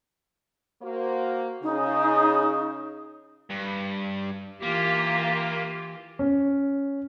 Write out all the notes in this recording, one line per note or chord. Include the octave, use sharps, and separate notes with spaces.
A#3 F#4 C5
C#3 D#4
G2
E3 A#3 F4 G4
C#4